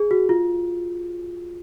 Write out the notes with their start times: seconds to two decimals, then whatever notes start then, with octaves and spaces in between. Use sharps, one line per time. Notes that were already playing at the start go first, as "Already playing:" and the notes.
Already playing: G#4
0.11 F#4
0.29 F4